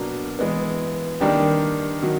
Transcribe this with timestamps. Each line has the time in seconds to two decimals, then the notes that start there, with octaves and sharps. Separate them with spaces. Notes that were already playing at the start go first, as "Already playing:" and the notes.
Already playing: B2 F#3 A#3 D4
0.39 E3 G#3 B3
1.20 D#3 G3 A#3 D4 G4
2.03 D#3 F#3